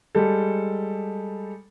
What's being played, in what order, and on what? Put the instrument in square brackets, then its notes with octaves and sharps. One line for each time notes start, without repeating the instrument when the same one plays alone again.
[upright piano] G3 G#3 A4